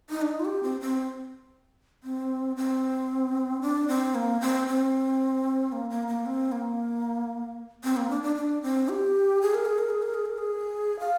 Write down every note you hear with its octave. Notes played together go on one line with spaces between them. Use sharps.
D#4
D4
D#4
F4
G4
C4
C4
C4
C4
D4
C4
A#3
C4
C4
A#3
A#3
A#3
C4
A#3
C4
A#3
D4
D4
D4
C4
G4
G#4
A#4
G#4
A#4
G#4
A#4
G#4
A#4
G#4
F5